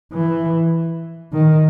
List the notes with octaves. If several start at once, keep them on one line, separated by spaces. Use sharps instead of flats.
E3
D#3